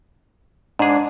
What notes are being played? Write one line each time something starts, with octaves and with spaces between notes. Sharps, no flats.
G#2 D4 G#4